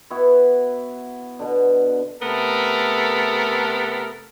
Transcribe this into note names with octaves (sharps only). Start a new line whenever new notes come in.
B3 E4 F#4 C#6
B2 D3
C3 A3 B3 A4 A#4